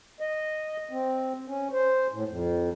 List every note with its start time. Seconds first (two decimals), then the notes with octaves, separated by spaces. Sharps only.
0.20 D#5
0.91 C4
1.48 C#4
1.73 C5
2.13 A2
2.28 F2